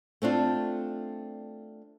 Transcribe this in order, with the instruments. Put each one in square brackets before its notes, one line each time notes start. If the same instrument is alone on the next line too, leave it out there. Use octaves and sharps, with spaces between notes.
[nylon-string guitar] A3 C4 D4 F4